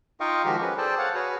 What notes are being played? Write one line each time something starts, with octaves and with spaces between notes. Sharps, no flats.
D#4 F4 D#5 F5 G5 C#6
D#3 F3 G#3 F#4 G4
C#4 G#4 B4
G#4 A4 C5 D5 G5 A5
C#5 F5 F#5 A5
F#4 G#4 B4 C#5